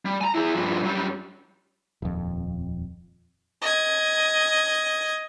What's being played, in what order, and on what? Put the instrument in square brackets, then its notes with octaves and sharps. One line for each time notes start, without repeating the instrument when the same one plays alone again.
[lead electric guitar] G3
G#5 A#5
E4 G#4
G2 F3
F#2 G3
[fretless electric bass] D#1 F2
[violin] D#5 G#6